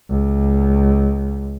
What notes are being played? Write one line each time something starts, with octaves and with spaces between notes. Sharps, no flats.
C#2